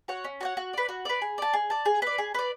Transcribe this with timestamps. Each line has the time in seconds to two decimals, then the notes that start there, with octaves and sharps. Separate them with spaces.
0.08 F#4 C#5 F#5
0.24 C#4
0.41 F#4 C#5 F#5
0.57 F#4
0.73 B4 D5
0.89 F#4
1.05 B4 D5
1.22 G#4
1.38 D5 A5
1.53 G#4
1.70 D5 A5
1.86 G#4
2.02 B4 D5
2.18 G#4
2.34 B4 D5